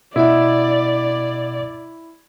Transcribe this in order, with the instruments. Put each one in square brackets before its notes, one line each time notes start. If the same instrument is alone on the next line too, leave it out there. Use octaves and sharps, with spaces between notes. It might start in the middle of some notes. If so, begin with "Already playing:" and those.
[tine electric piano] B2 D#5 F#5 [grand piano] E4 [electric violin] D5